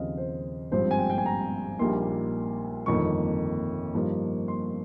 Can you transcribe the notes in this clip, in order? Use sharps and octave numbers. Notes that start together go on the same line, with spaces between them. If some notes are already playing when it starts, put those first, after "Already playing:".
Already playing: D#2 C#3 F3 C4 D#5 F5
C5
G#1 G2 F3 C4 C5
G#5
G5
G5
G#5
A#5
A#1 A#2 G3 A#3 D#4 C6
G1 F2 D#3 A#3 C#6
G2 F3 A#3 D#4
C6